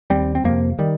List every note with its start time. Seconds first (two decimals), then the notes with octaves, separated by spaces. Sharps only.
0.10 D#2 G3 C4
0.35 C4
0.44 F2 C3 F3 A#3
0.79 D#3 G3